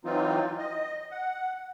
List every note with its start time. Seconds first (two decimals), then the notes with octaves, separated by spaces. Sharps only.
0.05 E3 F#3 C4 D#4 F4
0.58 D#5
1.11 F#5